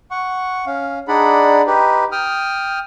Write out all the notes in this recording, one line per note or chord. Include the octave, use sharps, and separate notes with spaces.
F#5 C#6
C#4 F5
D4 D#4 G#4 D5 F#5 B5
D#4 G4 B4
G5 D#6 F6